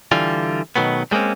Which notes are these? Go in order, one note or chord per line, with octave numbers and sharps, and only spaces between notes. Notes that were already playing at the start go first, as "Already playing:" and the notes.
D3 E3 G3 F4
B2 D#3 F#3 A3 B3
G3 G#3 A#3 C4 C#4